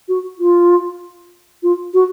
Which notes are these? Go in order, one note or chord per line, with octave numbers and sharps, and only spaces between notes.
F#4
F4
F4
F#4